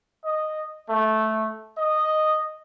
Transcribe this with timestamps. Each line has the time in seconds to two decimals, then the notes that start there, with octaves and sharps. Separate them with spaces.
0.25 D#5
0.89 A3
1.78 D#5